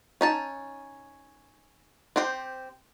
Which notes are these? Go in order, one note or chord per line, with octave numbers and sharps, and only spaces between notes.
C#4 D#4 A5
C4 G4 C5 G5